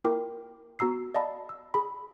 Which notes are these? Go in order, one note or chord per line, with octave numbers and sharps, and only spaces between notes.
A#3 E4 F4 A#4 G5 D6
B3 F#4 A#5 E6 C7
D5 D#5 F5 A5 B5
E6
G#4 B5